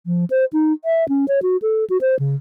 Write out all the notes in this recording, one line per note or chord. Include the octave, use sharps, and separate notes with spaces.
F3
C5
D#4
E5
C#4
C#5
F#4
A4
F#4
C5
C#3